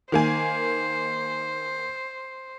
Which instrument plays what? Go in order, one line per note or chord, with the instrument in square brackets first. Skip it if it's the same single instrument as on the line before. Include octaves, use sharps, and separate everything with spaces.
[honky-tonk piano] D#3 A#3 G#5 [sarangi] C5